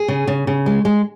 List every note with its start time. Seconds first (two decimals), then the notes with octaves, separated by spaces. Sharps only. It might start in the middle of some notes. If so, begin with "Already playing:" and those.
Already playing: G#4
0.08 C#3
0.27 C#3
0.47 C#3
0.66 G#3
0.85 G#3